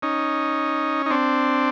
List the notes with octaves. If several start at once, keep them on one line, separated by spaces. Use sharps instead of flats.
C#4 D#4
D#4
C4 D4